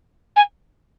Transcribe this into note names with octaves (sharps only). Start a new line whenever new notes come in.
G#5